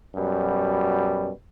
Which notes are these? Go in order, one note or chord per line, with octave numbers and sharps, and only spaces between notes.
F#2 B2 G3